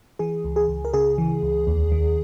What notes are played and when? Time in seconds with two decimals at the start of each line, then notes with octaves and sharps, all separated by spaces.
0.19 E3 G#4
0.44 C#2
0.56 G#4
0.68 C#2
0.85 A#4
0.93 C#3 G#4
1.18 E3
1.42 C#2
1.67 D#2
1.92 D#3